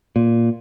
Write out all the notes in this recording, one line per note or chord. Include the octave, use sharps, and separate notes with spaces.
A#2